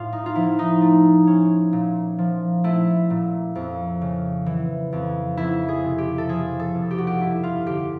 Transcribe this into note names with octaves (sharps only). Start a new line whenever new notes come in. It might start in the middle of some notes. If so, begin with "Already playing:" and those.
Already playing: A2 F4
D#4
F4
F3 E4
D#4
A3
C#4
A#2
F3
A3 E4
A#2
F2
C#3
E3
F2
F2 E4
G#4
C3
G4
A4
F3 G#4
A4
F2
G4
F#4
G4
G2 E4
F4
D3 G4